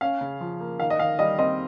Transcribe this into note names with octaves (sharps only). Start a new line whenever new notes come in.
C#4 F5
C#3
F3
A#3
D#3 F5
D#5
D#3 F5
G3 D#5
C4 D#5